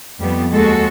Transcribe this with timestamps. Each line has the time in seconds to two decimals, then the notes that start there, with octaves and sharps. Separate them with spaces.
0.18 F2 G3 B3
0.53 D#2 G#3 F#4 A4